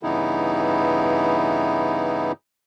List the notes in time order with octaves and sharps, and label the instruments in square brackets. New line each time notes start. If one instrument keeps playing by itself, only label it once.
[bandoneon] G2 C#3 E3 B3 D#4 E4